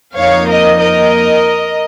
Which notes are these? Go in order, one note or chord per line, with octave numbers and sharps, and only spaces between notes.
F2 F3 A#3 D#4 C#5 F5
A#4 D#5
A#4 D#5